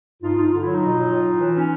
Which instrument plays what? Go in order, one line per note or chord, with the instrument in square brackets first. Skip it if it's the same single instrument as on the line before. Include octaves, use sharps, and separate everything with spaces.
[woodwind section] G2 D#4 F4
G2 D#4 F4
D3 F4
F#3 E4
D#4 F4
B2
F#3
A2
A2
E3
C#4 D#4